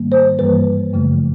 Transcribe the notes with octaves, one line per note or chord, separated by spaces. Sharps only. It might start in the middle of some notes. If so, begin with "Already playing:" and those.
Already playing: G#2 D#3 G3 A#3
C5
G2 E3 G3 A#3 B4
F#2 C#3 F3 A3